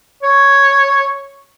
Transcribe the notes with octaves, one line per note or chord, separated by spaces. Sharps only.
C#5